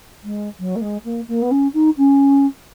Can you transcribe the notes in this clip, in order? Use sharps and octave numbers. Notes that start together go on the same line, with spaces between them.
G#3
F#3
A#3
G#3
A#3
A#3
B3
C#4
D#4
C#4